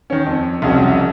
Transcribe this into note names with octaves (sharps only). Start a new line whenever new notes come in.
D#3 C#4
F2
C2 F2 C#3 F#3